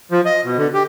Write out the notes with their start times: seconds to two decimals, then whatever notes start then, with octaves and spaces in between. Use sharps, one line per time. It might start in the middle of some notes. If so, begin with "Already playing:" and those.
0.12 F3
0.25 D#5
0.45 B2
0.57 D3
0.74 G4